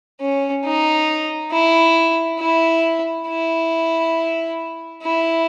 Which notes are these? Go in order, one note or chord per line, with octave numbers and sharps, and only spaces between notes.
C#4
D#4
E4
E4
E4
E4